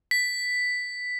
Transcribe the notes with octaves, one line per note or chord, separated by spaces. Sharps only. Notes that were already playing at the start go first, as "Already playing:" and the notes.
B6